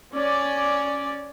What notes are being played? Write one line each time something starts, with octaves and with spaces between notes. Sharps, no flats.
C#4 D5